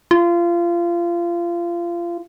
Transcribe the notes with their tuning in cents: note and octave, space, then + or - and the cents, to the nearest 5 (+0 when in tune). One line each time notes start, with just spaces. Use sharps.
F4 -25